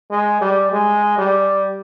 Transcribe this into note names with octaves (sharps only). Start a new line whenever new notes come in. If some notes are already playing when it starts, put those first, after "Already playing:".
G#3
G3
G#3
G3